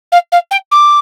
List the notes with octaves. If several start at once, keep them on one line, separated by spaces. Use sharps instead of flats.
F5
F5
G5
D6